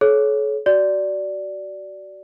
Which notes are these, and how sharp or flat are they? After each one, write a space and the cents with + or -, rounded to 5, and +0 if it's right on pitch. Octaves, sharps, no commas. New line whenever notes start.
A4 -40 C#5 +0
F#4 +25 D5 -5